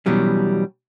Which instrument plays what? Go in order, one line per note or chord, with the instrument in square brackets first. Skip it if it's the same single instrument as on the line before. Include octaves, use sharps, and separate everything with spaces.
[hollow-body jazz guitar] B2 E3 F#3 G3 C#4